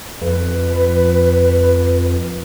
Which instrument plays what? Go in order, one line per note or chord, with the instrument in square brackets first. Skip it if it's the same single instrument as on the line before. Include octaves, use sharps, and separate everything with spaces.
[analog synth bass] F2 [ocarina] B4